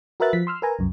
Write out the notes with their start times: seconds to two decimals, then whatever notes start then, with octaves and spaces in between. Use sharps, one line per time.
0.20 F#4 A#4 B4 E5 F#6 A6
0.33 F3 B6
0.47 C6 E6 F6
0.62 A#4 B4 G#5 A#5
0.79 C2 F#2